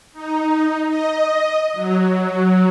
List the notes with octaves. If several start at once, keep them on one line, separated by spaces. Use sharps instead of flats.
D#4
D#5
F#3